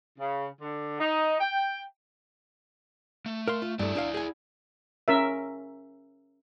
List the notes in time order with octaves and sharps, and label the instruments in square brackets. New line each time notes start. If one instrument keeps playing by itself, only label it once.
[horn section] C#3
D3
D#4
G5
[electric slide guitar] A3
[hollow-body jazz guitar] A#4 F5 C6
F4
[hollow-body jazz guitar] G2 A3 [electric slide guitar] E4 D5
[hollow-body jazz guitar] D4 G#4 F5
G#4 G#5
[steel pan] C#4 A#4 E5